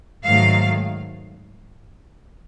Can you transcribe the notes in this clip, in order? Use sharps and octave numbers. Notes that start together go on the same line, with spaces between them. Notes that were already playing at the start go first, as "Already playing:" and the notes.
G#2 D#3 F#3 A3 F5